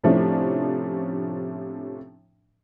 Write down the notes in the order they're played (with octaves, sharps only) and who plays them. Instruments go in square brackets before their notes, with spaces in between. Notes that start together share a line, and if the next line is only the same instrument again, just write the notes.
[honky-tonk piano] A2 C3 F3 A3 C#4 D4